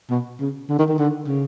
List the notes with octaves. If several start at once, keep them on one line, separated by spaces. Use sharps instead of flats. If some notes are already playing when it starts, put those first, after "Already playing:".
B2
C#3
D3
D#3
D#3
D3
C#3